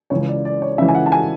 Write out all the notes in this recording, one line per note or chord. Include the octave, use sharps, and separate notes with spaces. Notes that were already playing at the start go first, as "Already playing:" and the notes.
C#2 C#3 E3 C#5
D5
D5
C#5
C#2 C#3 E3 E5
G#5
F#5
A5
G#5